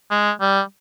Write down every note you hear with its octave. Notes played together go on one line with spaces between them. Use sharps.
G#3
G3